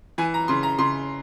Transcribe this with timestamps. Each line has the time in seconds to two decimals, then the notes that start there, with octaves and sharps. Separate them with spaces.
0.18 E3 G#5
0.34 A#5
0.48 C#3 C6
0.63 A#5
0.79 C#3 C6